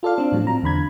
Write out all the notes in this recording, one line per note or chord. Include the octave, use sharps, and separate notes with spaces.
F4 A4 D5 F5
C4 D4
A2 F3 F#3
C4 A#5
E2 D3 B5 G#6